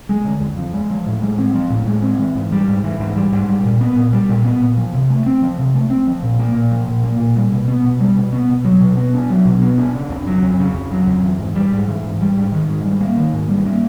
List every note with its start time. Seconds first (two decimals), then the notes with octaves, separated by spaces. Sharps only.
0.09 G#3
0.25 D3
0.41 F2
0.57 F3
0.73 G#3
0.90 F3
1.06 A2
1.22 G#3
1.38 C4
1.54 F3
1.70 A2
1.87 G#3
2.02 C4
2.19 E3
2.35 G#2
2.52 G3
2.68 G#2
2.84 E3
3.00 G#2
3.16 G3
3.32 G#2
3.49 G3
3.64 A#2
3.81 B3
3.96 A#2
4.13 G3
4.29 A#2
4.44 B3
4.61 A#2
4.77 F3
4.93 C3
5.10 A3
5.26 C4
5.42 F3
5.58 C3
5.74 A3
5.90 C4
6.07 F3
6.23 A#2
6.39 A#3
6.55 A#2
6.71 F3
6.88 A#2
7.03 A#3
7.20 A#2
7.36 G3
7.52 B2
7.68 B3
7.84 B2
8.00 G3
8.16 B2
8.33 B3
8.49 B2
8.65 F#3
8.80 B2
8.97 B3
9.14 D4
9.30 F#3
9.45 B2
9.62 B3
9.78 D4
9.94 C#3
10.10 F2
10.27 F#3
10.42 F2
10.59 C#3
10.74 F2
10.91 F#3
11.07 F2
11.23 E3
11.39 G#2
11.55 G3
11.72 G#2
11.88 E3
12.04 G#2
12.20 G3
12.37 G#2
12.52 D#3
12.69 G#2
12.84 G3
13.01 A#3
13.17 D#3
13.33 G#2
13.49 G3
13.65 A#3